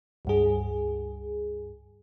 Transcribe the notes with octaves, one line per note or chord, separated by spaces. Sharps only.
C#2 G2 G#4